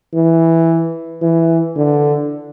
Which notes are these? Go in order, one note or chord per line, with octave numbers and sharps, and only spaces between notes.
E3
E3
D3